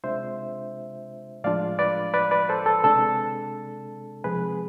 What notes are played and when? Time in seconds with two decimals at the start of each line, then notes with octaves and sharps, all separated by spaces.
0.04 C3 G#3 D4 F4 C5 E5
1.44 A2 F3 G#3 D4 F4 D5 F5
1.79 B4 D5
2.14 B4 D5
2.31 B4 D5
2.49 A4 C5
2.66 A4
2.84 C3 G#3 D4 A4
4.24 C3 F3 G#3 G#4 B4